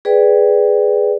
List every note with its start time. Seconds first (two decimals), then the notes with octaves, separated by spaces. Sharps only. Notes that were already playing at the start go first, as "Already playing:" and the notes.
0.05 G#4 B4 D5 G5